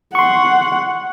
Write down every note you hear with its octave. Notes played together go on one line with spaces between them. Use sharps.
F#5 C6 C#6